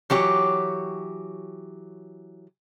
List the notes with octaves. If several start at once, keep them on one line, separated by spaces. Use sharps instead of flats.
E3 F#3 G4 C#5